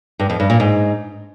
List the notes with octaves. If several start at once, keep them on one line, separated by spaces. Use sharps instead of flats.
G2
F2
G2
A#2
G#2